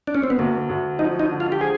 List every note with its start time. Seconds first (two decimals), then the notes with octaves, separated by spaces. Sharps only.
0.07 D4
0.15 C#4
0.24 C4
0.30 B3
0.39 D2 A#3
0.69 D2
0.99 F3 D#4
1.20 D#4
1.31 D3
1.40 F4
1.52 G4
1.61 F3 G#4